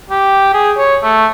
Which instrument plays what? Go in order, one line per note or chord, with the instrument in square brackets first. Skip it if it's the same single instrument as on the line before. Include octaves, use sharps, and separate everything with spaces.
[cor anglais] G4
G#4
C#5
A3